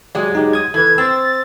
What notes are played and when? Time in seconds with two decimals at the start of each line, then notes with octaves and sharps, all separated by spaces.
0.15 F#3 G#3 F#4 G4 D5
0.35 D#4 G4 G#4
0.53 D#6 G#6
0.74 E3 A4 B4 G#6
0.98 C4 E6 A6